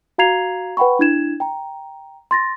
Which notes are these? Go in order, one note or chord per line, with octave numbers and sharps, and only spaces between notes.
F#4 F5 A#5 G#6 C7 F7
B4 F#5 G5 B5 C#6
D4 E4 G#6 E7
G5 A#5
C6 A6 A#6